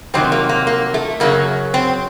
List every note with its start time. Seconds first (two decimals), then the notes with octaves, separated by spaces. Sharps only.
0.14 F2 C3 D#3 F#3 C4
0.32 A#3
0.49 A#3
0.67 A#3
0.94 A3
1.20 F#2 C#3 F#3 A#3
1.74 C4